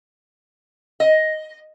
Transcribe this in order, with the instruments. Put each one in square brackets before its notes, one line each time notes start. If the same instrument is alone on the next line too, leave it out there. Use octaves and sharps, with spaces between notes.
[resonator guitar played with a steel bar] D#5